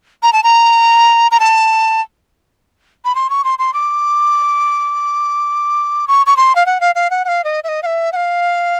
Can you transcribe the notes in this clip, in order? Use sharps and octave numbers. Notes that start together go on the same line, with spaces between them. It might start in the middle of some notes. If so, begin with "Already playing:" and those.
A#5
A5
A#5
A#5
A5
B5
C6
C#6
C6
C6
D6
C#6
C#6
C6
F5
F#5
F5
F5
F#5
F#5
F5
D#5
E5
D#5
F5
E5
F#5
F5